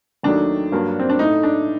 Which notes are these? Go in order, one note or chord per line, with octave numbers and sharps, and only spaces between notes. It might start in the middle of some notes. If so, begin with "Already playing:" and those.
D#2 D#3 F#3 A3 D4
G2 F#3 A#3
C4
D4
A2 A3 D#4
D4